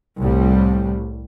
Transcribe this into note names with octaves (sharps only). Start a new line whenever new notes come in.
C2 A2 G3